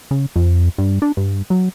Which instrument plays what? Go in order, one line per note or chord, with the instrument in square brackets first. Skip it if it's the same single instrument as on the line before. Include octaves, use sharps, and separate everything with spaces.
[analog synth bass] C#3
F2
G2
D4
G2
F#3